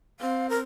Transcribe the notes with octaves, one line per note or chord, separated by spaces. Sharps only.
C4 F5
A#4